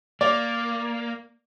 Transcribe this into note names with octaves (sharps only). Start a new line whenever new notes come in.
A#3 D5